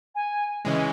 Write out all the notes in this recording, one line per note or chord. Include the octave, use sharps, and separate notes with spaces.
G#5
C#3 E3 G#3